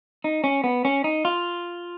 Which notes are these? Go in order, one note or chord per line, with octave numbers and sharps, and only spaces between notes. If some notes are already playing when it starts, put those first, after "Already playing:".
D#4
C#4
B3
C#4
D#4
F4